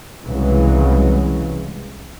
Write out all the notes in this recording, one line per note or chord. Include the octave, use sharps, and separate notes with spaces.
C2 C#3 E3 F#3 G#3